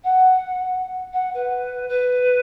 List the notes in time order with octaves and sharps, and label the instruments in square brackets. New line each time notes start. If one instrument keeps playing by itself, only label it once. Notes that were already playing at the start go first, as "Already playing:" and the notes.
[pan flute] F#5
F#5
B4
B4